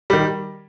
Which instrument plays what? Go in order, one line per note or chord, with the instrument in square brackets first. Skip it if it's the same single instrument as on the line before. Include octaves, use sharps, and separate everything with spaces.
[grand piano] D#3 G3